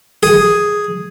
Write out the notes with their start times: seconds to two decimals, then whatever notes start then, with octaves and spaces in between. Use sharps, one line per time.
0.23 G#4